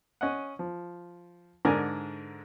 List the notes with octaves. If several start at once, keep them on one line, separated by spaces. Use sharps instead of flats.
C#4 D#5 F#5
F3
G#2 D3 A#4 D5 G#5